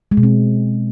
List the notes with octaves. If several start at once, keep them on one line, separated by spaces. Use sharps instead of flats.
G#3
B2
C4